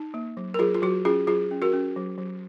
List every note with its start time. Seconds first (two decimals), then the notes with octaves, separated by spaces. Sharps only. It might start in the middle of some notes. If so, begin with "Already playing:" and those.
Already playing: D#4
0.14 A#3
0.37 F#3
0.54 A#4
0.59 F#3 F4 G#4
0.74 F4
0.82 F#3 F#4
1.05 C#4 F4 G#4
1.27 F#3 F4 G#4
1.51 C#4
1.62 F#4 A#4
1.73 C#4
1.96 F#3
2.18 F#3